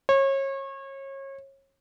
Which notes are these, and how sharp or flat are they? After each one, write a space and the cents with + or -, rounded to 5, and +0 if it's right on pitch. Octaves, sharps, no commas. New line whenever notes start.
C#5 -30